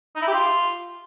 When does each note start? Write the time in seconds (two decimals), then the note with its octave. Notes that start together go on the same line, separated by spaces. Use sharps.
0.16 D#4
0.22 E4
0.28 G4
0.34 F4